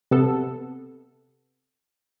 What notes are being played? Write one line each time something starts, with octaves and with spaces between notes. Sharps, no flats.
C3 B3 A4